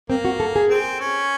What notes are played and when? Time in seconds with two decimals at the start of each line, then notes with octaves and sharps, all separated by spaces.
0.10 A#3 C4
0.25 F#4
0.40 A4
0.56 G#4
0.70 C4
1.00 C#4